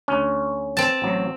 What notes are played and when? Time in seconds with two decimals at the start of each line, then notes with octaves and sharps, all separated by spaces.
0.08 D2 C#4
0.77 C4 A5
1.02 A1 F#3